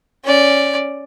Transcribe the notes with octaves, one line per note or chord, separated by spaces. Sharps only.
C#4 D5